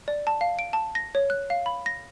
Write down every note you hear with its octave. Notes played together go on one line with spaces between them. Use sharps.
D5
A5
F5
D7
A5
A#6
C#5
F#6
F5
B5
A#6